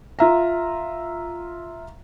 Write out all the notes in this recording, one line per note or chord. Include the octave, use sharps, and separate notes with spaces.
F4 E5 A#5